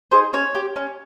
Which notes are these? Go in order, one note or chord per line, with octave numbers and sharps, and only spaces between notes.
D#4 G#4 C5
C#4 C#5
G4
C#4